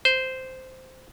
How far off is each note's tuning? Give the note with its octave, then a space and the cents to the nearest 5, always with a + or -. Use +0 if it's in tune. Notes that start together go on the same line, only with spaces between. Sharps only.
C5 -10